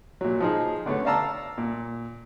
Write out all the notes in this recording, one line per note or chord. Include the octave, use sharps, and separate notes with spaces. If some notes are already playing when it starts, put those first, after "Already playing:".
A#2 F#3
F3 D#4 G#4
D3 A3 B3 C#4
D5 F5 A5 A#5 E6
A#2